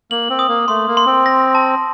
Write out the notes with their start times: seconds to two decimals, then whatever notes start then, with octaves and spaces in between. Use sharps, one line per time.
0.11 A#3 F#7
0.30 C4
0.39 D#6
0.48 A#3
0.68 A3 C6
0.87 A#3
0.97 C6
1.06 C4
1.26 A#6
1.55 A5